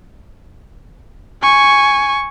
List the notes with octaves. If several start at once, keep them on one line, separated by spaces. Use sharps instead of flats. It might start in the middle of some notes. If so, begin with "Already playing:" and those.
G#5 C#6